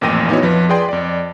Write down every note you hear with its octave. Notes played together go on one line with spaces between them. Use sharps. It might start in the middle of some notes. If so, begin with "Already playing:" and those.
A1 F2 A#2 G5 A#6 D#7
B3 D#4 E4 F#4 C#5
F2 F3 B4
G#4 B4 D5 G5 C6
F2 D5